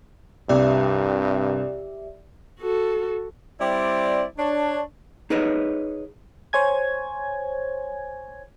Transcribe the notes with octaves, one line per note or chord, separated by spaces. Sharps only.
C2 G2 G4 D5 E5
F#4 A4
G3 C4 E4 D5
D4 C#5
D#4 G#4 B4 C#5 D#5
C5 C#5 G#5 G#6